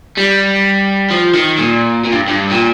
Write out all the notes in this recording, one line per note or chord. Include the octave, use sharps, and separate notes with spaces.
G3
F3
D#3
A#2
A#2
G2
G2
A#2